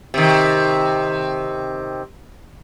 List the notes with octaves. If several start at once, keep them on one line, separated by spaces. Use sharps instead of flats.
C3 D#3